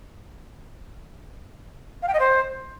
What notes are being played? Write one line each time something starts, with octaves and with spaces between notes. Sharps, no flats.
F5
G5
D#5
C5